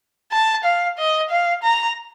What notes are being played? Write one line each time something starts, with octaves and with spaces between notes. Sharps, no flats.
A5
F5
D#5
F5
A#5